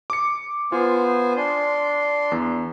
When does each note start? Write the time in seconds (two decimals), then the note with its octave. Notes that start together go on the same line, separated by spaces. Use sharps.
0.10 D6 C#7
0.72 B3 F4 C5 G#5
1.36 D4 C6
2.32 E2